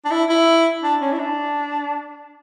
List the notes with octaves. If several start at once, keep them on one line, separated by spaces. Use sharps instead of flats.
D4
E4
E4
D4
C#4
E4
D4